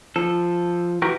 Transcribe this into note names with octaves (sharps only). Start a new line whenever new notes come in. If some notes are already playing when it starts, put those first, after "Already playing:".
F3 A4
E3 F#4 G4 A#4